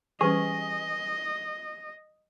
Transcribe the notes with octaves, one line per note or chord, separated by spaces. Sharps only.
E3 G3 C#4 G4 G#4 B4 D#5 C#6